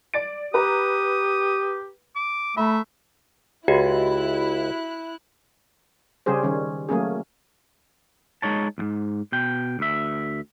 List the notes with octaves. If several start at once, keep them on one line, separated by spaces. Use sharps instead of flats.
D5 A6 D7
G4 B4 A#5 D#6
D6
A3 E5 A#5 B5
C#2 E4 F#4 G4 F#6
C#3 G3 C#4 G4 G#4 C5
D#3 G3 C#4
F#3 A3 A#3 C#4 G#4
G#3 D#4 C#5 A5
B1 G#2
B2 G5
D2 E5